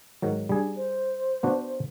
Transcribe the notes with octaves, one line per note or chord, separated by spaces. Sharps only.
G#2 D#3 F#3
G3 D4 G#4
C5
B3 D4 F#4